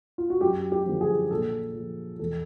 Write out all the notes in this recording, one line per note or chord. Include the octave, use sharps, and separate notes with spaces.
F4
F#4
F#2 G4
G4
D3 F3
G#4
A#2 A4
F3
E2 A4